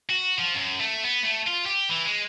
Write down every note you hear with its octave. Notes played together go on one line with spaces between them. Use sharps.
F#4
F3
F#2
A3
B3
A3
F4
G4
E3
G#3